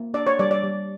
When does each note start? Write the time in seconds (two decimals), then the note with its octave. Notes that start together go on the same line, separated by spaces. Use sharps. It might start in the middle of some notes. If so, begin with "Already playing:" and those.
Already playing: A#3
0.14 D4 D5
0.27 C#5
0.39 G3 D5
0.51 D5
0.63 G3